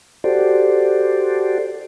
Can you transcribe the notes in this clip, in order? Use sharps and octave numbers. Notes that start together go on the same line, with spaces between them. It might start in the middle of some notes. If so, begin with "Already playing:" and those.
F#4 G4 A4 C5 D5